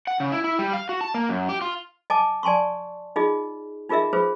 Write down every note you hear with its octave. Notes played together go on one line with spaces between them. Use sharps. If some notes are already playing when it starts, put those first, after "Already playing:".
F#5
C#3
E4
E4
G3
F5
F#4
A5
A#3
F#2
G4
F4
D#5 G#5 A5 D6
D5 G#5 A5 C6 C#6
D#4 F4 G#4 D#5
D#4 F4 G#4 A#4 D#5 E5
F4 G#4 B4 C5